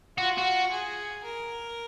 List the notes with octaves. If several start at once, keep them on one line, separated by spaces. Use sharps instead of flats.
F4 F#4
F#4
G#4
A#4